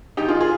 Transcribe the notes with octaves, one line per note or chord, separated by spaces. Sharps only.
G#1 D#4 G4
F4 G#4
F4 G#4